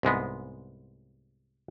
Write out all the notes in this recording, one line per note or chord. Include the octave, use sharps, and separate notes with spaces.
C2 G#2 G#3 B3